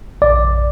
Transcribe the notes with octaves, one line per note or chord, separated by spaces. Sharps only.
A#1 D5